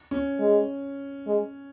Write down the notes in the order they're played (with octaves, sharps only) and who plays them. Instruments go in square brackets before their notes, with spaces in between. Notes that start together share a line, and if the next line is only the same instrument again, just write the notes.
[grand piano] C#4
[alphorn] G#3
G#3